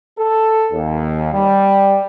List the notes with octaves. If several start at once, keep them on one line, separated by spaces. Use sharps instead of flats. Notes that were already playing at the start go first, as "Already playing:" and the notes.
A4
D#2
G3